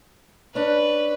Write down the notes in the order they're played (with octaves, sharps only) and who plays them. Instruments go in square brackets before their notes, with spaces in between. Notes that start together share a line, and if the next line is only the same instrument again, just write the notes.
[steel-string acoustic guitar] C#4 D4 [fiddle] B4